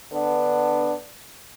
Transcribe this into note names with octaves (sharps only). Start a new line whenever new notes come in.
D3 B3 D4